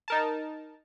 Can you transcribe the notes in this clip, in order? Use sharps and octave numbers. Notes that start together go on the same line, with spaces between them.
D#4 A#4 A5